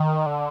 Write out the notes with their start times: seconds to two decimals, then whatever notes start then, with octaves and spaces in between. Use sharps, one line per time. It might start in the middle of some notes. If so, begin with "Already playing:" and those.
Already playing: D#3
0.26 D3